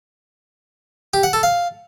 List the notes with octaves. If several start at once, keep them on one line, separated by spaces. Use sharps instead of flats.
G4
F#5
A4
F5